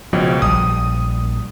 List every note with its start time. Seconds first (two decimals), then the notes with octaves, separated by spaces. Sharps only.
0.13 C#2 B2 F3
0.42 A#1 G3 D#6